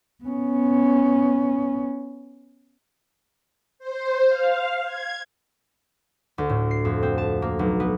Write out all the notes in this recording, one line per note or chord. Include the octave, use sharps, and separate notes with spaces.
B3 C#4
C5
F5
G#6
D2
A2
C7
F2
C4
A5
A#3
B1
B3